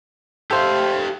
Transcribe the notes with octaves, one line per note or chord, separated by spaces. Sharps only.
G4 A4 C5 E5 F5